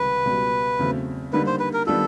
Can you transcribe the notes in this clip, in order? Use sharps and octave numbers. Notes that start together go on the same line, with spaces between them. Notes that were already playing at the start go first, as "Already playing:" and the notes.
Already playing: C#2 C3 D#3 G3 B4
C#2 B2 G3
E2 C#3 F#3 A3 C4
D3 G3 A#3 D#4 B4
C5
B4
A#4
D#3 G3 B3 D4 F4 A4